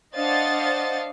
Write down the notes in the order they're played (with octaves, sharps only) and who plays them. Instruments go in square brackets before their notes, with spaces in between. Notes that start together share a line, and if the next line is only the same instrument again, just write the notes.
[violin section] D4 C5 D#5 F5 F#5 A6